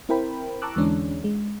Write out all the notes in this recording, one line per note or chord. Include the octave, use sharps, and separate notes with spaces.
C4 E4 A#4 C5 G5 B5
A5 A#5 C#6 D6 E6 F#6
E2 D3 E3 G#3 C#4 D4
G#3